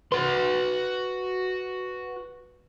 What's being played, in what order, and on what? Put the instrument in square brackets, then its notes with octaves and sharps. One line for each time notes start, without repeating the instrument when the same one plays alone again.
[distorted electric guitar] F#4 C6 [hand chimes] B4